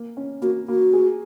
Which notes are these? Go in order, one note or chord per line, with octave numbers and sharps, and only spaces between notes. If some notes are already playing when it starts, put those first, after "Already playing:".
Already playing: A#3
C#4
A#3 F#4
A#3 F#4
G#4